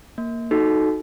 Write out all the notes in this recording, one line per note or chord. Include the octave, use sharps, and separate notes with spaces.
A#3
D#4 F#4 A4